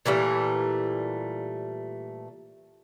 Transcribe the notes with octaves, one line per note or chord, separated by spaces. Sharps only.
A#2 E3 G3 A3